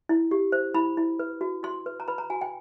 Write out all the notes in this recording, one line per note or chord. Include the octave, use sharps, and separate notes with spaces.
E4
G4
C5
E4 B5
E4
B4
F#4
F#4 C6
B4
A#5
B4 B5
A#5
F#4 G#5
G5